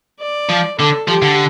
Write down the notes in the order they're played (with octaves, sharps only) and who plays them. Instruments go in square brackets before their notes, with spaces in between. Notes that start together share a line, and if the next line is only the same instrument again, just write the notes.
[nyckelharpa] D5
[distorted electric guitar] F3
[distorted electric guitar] D3 [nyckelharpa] A4
[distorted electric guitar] F3 [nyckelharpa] G4
[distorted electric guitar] D3